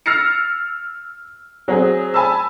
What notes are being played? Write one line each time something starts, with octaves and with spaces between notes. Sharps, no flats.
E6 F6 A6 A#6 C7 C#7
F#3 C4 G#4
G#5 A5 B5 E6